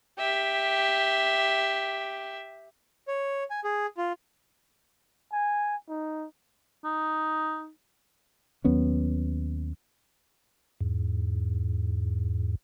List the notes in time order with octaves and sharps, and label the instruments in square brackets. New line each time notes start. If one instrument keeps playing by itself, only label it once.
[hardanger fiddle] G4 E5
[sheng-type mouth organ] C#5
G#5
G#4
F4
[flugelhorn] G#5
D#4
[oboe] D#4
[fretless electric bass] D#2 F#3 B3 C#4
[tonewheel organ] E2 G#2